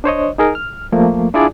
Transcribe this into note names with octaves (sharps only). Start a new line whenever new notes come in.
D4 C5 C#5 D#5
D#4 G#4 A#4
F6
F3 A3 A#3
D4 E4 F4 G#4 D5